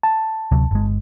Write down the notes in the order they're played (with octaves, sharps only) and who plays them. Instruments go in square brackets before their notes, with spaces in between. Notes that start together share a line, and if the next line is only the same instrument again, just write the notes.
[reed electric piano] A5
[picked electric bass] D2 C3 F#3
G1 G#3